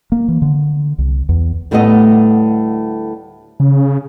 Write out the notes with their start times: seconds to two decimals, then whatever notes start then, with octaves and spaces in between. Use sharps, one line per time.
0.12 A#3
0.28 E3
0.42 D3
0.98 C2
1.29 E2
1.71 D2 A2 G3 A3 B3 D#5
3.60 C#3